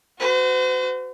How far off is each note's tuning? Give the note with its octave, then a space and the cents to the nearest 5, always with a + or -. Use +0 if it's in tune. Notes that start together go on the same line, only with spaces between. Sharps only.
F#4 +0 C5 -45